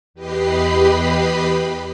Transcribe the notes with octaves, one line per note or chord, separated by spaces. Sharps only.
E2 G4 B4 D#5 B5 C7